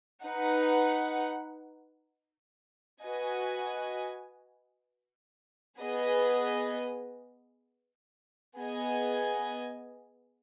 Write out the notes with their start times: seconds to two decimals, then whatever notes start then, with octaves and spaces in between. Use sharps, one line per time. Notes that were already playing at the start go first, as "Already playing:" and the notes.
0.24 D#4 B4 F#5
3.03 F#4 B4 D#5 G#5
5.80 B3 G#4 B4 D#5
8.57 B3 G#4 D#5 G#5